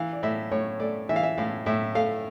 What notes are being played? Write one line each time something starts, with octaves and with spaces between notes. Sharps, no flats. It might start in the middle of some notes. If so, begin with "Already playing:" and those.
Already playing: E3 F5
D5
A2 E5
A2 C#5
A3 D5
E3 E5
F5
E5
A2 F5
A2 E5
A3 F5